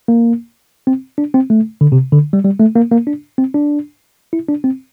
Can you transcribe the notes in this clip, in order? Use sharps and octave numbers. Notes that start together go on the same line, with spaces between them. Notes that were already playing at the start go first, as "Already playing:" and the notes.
A#3
C4
D4
C4
A3
D3
C3
D3
G3
G3
A3
A#3
A#3
D4
C4
D4
E4
D4
C4